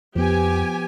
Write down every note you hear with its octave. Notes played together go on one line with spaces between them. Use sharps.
F2 F3 B3 G4 G#5